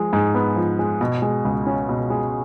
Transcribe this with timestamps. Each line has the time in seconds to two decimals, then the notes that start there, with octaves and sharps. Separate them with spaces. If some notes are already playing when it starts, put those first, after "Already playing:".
Already playing: F3 G#3
0.13 G#2
0.34 B3
0.56 F3
0.79 G#3
1.01 B2
1.22 G#3
1.45 C#2
1.67 C#4
1.89 B2
2.10 G#3